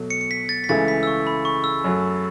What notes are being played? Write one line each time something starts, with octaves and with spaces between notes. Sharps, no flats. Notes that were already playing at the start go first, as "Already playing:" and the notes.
Already playing: B2 F#3 A3
C#7
C#7
B6
A6
B6
C#2 C#3 E3 A3 E4 A6
B6
E6
C#6
B5
C#6
E6
F#2 F#3 A3